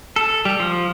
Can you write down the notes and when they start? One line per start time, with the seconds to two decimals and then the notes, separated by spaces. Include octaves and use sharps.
0.16 A4
0.45 G3
0.60 F3